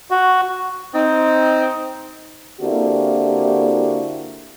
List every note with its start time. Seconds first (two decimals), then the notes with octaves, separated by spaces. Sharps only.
0.10 F#4
0.94 C4 D#4
2.61 D3 A#3 C4 E4 F#4 G4